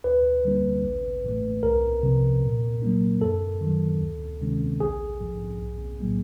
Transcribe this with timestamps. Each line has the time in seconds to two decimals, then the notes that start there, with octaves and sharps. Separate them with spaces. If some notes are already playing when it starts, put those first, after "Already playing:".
0.04 D2 B4
0.45 D3 G3 A#3 D4
0.84 A1
1.24 A2 E3 A3
1.63 C2 A#4
2.03 C3 F3
2.43 A#2
2.82 F#3 A#3 D4
3.21 F#2 A4
3.61 D#3
3.66 F#3
4.01 D2
4.41 C3 D#3 G#3 C#4
4.80 A#1 G#4
5.20 G#2 F3
5.61 B1
6.00 A2 F#3 A#3